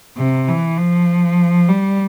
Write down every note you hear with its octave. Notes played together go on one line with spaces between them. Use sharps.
C3
E3
F3
G3